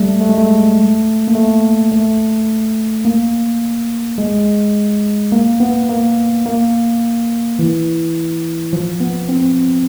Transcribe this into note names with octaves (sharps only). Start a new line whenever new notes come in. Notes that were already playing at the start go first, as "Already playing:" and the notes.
Already playing: G3 A3
A3
G#3
A3
A#3
A3
A3
A#3
G#3
A#3
B3
A#3
A#3
E3
F3
B3
C4